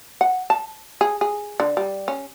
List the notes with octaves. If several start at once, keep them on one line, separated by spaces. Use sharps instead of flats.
F#5
A5
G#4
G#4
D3
G3
C#4